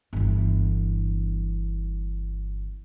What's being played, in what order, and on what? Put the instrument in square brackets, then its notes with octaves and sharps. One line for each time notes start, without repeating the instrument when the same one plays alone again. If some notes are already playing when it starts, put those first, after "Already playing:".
[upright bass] G1 E3